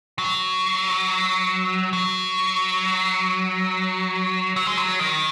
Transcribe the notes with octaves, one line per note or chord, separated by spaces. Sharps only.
F#3
F#3
F#3
G#3
F#3
D#3